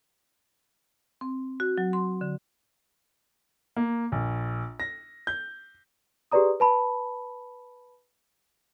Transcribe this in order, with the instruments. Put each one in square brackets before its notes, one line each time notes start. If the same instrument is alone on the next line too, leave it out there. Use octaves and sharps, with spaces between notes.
[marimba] C4
F#4
F#3
C6
D3
[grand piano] A#3
A#1
A#6
G6
[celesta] G4 G#4 B4 D5 A#5 D#6
B4 A5 B5